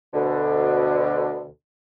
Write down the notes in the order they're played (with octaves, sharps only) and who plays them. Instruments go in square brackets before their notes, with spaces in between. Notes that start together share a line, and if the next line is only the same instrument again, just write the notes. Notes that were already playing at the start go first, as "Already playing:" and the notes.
[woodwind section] D2 B2 D3